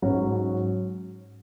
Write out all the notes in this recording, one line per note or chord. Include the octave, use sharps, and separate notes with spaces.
G#2 F#3 C#4